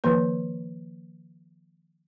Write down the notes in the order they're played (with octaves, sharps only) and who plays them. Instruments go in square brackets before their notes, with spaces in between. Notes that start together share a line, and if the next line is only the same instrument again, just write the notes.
[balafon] D#3 F3 A#3 B4